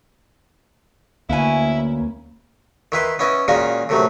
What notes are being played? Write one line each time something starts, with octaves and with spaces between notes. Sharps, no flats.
D2 A#3 B3 C#4 E4 G#5
D#3 E4 B4 C6
B3 C#4 E4 D#5
A#2 D#3 G#3 A#3 C#4 F#4
A2 C3 D#3 F#3 A3